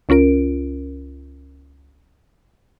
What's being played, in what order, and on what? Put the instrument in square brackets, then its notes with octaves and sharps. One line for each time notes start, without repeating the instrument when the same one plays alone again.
[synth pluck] C#2 C#4 F4 A#4 D7